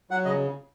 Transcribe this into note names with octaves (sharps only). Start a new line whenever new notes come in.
F#3 F#5
C#3 D#5